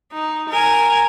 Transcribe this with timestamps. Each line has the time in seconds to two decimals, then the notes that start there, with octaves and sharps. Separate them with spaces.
0.13 D#4
0.49 A#4 G#5